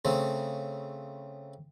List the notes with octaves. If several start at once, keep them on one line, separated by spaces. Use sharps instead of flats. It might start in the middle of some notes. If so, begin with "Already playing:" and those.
C#3 A3 C4